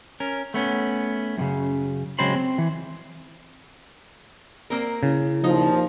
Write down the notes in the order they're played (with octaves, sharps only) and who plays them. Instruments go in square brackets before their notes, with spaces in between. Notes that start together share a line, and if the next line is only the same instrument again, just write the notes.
[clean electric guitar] C#4 A#4
A3 B3 C#4
F#2 A2 C#3
C#3 F#3 G#3 C4 C5 B5
C4
E3
[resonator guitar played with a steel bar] A#3 C4 A#4
[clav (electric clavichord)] C#3 [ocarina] E4
[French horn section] D#2 A#2 F3 [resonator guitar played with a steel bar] D#4